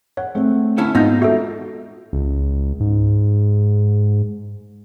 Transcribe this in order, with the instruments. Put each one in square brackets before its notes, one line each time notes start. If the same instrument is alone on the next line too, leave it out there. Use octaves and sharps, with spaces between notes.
[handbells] C#5 [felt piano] F#5
[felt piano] A3 C4
[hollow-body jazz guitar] D3 C#4 E4
[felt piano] G#2 D#5 A#6 [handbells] B3 G6 [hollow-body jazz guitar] D#4 F4
[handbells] F#4 A4 [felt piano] E5
[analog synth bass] C#2
G#2